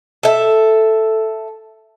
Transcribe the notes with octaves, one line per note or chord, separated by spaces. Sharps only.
A4 E5